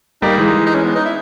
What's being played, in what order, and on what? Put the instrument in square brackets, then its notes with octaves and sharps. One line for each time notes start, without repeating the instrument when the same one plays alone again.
[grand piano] G3 A#3 [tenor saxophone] D#4
[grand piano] E3 G#3
[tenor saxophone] D#4
C#4
B3
D#4
E4